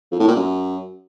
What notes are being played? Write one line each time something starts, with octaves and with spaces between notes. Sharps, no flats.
F2
A2
A#2
F#2